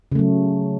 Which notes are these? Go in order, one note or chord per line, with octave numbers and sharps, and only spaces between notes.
C#3 F#3 A3